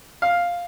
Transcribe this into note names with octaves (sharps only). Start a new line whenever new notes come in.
F5